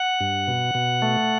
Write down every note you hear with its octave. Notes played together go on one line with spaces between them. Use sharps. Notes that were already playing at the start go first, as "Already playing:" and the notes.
Already playing: F#5
G2
B2
B2
A3